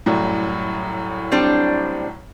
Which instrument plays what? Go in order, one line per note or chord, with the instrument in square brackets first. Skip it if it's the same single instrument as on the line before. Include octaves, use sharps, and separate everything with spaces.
[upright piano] C2 F#2 A2
[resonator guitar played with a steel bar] G3 C4 D4